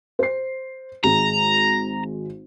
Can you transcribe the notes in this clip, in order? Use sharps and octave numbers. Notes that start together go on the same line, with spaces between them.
C5 C7
G#1 G#3 A#5